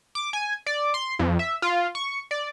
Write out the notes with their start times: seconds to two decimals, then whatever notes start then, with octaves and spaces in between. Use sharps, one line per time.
0.15 D6
0.33 G#5
0.66 D5
0.94 C6
1.19 F2
1.39 E5
1.62 F4
1.95 C#6
2.31 D5